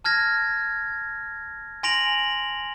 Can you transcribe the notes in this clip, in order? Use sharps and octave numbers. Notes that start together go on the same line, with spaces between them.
A5 F6 G#6 A#6
G#5 C6 A#6 D7 F7 F#7